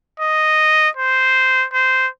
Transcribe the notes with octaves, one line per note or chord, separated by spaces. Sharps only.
D#5
C5
C5